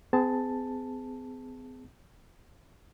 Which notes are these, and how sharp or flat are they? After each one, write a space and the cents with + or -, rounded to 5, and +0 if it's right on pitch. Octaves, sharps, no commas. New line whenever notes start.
C4 -45 G#4 +0 A5 +5